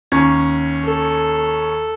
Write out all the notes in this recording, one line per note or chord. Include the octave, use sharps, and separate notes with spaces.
D#2 C#4
A4